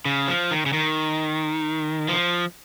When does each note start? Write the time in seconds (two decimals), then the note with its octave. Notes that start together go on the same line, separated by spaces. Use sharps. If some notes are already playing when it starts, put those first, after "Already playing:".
0.05 C#3
0.28 F3
0.51 D#3
0.66 C#3
0.73 D#3
2.08 F3